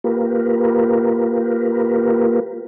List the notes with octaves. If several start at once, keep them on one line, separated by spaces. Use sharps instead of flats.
A#3 F4 G4 A#4 B4